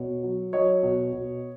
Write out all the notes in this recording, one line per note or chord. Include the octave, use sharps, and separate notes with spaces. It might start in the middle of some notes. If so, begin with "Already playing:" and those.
Already playing: B2 C#5
F#3
F#3 C#5 D#5
B2
B2